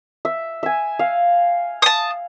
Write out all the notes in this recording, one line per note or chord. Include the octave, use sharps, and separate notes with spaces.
E5
E5 G#5
F5
A5 D#6